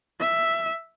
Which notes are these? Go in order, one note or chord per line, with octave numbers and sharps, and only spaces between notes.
E5